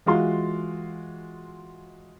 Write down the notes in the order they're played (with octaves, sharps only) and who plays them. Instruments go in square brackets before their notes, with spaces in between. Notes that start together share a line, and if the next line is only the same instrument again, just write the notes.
[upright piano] E3 G#3 F4 F#4 C6